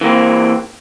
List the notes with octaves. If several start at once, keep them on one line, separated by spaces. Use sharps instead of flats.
E3 A#3 C4